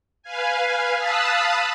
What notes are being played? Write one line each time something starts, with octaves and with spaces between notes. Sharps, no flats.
B4 F5 G#5
F5 A5 B5 D#6 E6 F#6